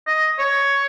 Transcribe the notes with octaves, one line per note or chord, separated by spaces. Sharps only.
D#5
C#5